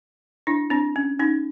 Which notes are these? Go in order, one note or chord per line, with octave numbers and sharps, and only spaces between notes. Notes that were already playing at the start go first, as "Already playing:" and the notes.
D4 E4
C4 D4
C#4
C#4 D#4